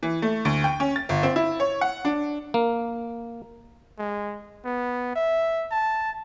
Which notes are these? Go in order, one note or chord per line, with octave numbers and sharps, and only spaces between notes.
E3
A3
D2
G5
C#4
A6
G1
C4
E4
C#5
F#5
D4
A#3
G#3
B3
E5
A5